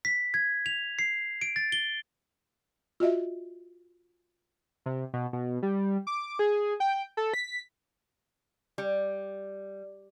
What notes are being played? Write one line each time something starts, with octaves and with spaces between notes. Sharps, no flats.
B6
G#6
F7
C7
D7
A6
G7
F4 F#4 D#5 E5
C3
B2
B2
G3
D6
G#4
G5
A4
B6
G3